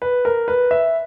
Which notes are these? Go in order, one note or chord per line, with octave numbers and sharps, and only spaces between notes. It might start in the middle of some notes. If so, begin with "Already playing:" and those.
B4
A#4
B4
E5